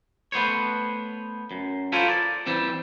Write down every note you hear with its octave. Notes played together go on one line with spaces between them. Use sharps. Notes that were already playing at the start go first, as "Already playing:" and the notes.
A3 B3 C5 C#5
F#2
E4 F4 A4 A#4 C5 C#5
D5
E3 G3 C4